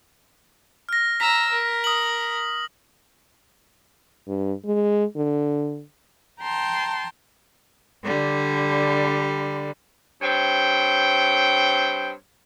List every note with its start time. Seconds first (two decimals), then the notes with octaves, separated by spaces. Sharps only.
0.89 F6 A#6
1.20 A#5 E6 B6
1.51 A#4
1.84 D#6 F#7
4.28 G2
4.66 G#3
5.17 D3
6.42 G5 A5 A#5 C6
8.03 D3 G3
10.22 G2 C4 C#5 G5